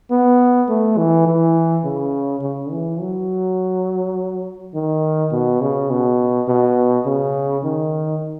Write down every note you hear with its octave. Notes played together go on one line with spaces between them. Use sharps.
B3
A3
E3
E3
C#3
C#3
E3
F#3
D#3
B2
C#3
B2
B2
C#3
D#3